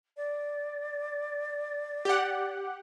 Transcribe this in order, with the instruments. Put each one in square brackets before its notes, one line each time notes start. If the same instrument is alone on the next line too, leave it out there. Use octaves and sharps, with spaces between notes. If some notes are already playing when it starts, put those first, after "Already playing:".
[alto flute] D5
[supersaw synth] G4 F#5